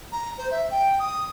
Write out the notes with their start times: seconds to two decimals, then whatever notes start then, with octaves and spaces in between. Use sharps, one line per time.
0.12 A#5
0.38 C5
0.51 E5
0.71 G5
0.99 D#6